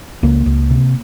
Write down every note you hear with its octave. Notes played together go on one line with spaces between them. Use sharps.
C#2 A#3
C#2
C3